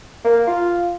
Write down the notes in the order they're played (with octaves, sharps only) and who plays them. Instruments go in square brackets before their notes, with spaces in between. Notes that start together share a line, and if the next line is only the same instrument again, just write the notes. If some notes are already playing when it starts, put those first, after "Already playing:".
[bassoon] A#3
F4